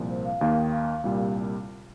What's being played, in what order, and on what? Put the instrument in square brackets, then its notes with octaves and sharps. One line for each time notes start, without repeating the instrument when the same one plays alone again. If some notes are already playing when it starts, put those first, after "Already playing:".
Already playing: [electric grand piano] C2 A#2 F3
[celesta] C5
F5
[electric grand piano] D#2 D#3 A#3 [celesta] F5
[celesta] G5
F5
[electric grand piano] C2 A#2 G3